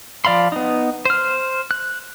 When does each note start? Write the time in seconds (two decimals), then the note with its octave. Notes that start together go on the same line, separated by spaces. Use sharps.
0.25 F3 D5 F5 B5 C6
0.52 B3 D#4
1.05 C5 F6
1.71 F#6